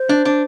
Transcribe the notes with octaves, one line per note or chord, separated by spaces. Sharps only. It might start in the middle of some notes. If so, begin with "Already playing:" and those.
Already playing: C5
D4
D4